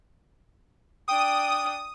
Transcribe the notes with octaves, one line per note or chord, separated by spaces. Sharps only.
D4 G5 D#6